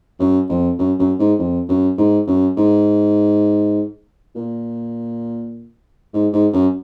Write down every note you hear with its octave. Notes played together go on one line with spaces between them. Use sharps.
F#2
F2
F#2
F#2
G#2
F2
F#2
G#2
F#2
G#2
A#2
G#2
G#2
F#2